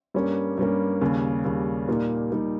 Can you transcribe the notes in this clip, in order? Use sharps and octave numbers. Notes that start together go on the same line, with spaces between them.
G2 G3 A#3 C#4
G2 G3 A#3 C#4
D#2 C#3 G3
D#2 C#3 G3
A#2 G3 A#3 D#4
A#2 G3 A#3 D#4